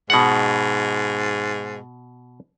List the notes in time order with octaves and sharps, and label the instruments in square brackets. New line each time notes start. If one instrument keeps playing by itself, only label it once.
[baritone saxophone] G#2 [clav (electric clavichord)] B2 F#5